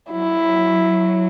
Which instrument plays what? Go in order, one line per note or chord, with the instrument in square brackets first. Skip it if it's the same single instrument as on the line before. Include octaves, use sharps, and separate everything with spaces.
[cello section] F#3 [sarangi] E4